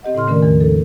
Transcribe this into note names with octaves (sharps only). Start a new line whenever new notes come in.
C4 G4 D#5 F#5
A2 C#3 E4 C6 F6
D#3 A3 C#4 A#4 D5
E2 D#3 F3 F#4 A#4
G#3 D#4 A4